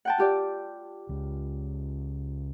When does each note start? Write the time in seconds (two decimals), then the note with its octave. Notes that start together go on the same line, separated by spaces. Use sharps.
0.05 F#5 G5 A5
0.18 F4 G4 D5
1.09 C#2